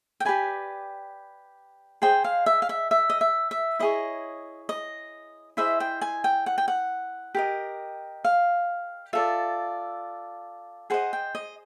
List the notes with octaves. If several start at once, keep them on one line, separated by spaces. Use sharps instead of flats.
G5
G4 B4 D5 G#5
G#4 C5 D#5 G5
F5
E5
F5
E5
E5
D#5
E5
E5
E4 G#4 C#5 D#5
D#5
E4 G#4 C5 D#5 E5
G5
G#5
G5
F#5
G5
F#5
G4 A#4 D#5
F5
F4 A4 D5 E5
G#4 C5 D#5 F#5
G5
D#5